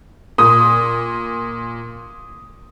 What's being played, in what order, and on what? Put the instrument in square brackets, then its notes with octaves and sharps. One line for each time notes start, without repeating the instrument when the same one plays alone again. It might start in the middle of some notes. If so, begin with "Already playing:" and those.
[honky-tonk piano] A#2 [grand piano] D#6